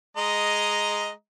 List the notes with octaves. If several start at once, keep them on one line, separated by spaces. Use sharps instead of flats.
G#3 D#5 A#5